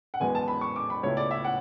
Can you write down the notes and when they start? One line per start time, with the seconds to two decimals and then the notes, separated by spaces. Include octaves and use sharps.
0.14 F#5
0.20 F#1 E2 B2 G#3 B3 G#5
0.35 A5
0.48 B5
0.61 C#6
0.76 D6
0.90 B5
1.03 C#2 B2 A3 E4 C#5
1.17 D5
1.31 E5
1.45 F#5